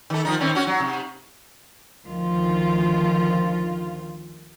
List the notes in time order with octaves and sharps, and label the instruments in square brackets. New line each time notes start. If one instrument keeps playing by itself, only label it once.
[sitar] D#3 A4
D#3 F3 D#4
D#3 C4 C#4
C#4 F#4
F#3
C3
[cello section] D2 D#3 F3 F4